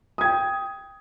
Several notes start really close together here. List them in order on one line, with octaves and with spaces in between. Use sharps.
D#6 G#6 G5